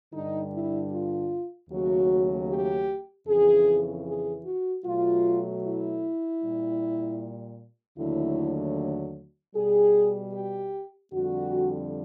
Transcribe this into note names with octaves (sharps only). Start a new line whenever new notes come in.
G2 D3 G3 D#4
E4
F4
D#2 C#3 F#3 A3 F#4
G4
F2 C#3 E3 G#4
G#4
F#4
B2 F#3 A3 F4
E4
A#2 G3
D#2 D3 F#3 A3 E4
B2 G3 G#4
G4
F2 D3 G3 F#4